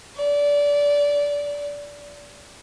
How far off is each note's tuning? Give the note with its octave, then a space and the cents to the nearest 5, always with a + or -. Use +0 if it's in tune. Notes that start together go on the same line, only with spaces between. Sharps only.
D5 -20